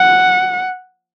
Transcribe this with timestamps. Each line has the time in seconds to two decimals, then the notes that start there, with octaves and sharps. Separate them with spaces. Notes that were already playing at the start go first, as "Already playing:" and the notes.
Already playing: F#5